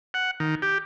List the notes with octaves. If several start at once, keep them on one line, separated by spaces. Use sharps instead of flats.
F#5
D#3
G4